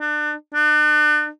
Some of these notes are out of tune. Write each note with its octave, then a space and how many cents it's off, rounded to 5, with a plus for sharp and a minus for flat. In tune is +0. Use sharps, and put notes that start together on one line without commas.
D4 +35
D4 +40